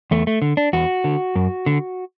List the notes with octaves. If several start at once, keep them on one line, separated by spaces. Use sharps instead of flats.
E2 A3
A3
D3
D4
E2 F#4
D3
F#2
D3